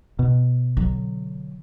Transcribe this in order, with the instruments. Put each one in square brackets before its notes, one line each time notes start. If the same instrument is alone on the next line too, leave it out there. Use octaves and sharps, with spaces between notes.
[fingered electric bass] B2
[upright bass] D3 F#3